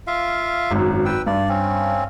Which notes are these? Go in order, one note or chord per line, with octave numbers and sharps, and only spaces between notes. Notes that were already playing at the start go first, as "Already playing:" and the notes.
F4 E5 F5
G#1 F#2
B4 G5 E6
G2 D5
C4 C#4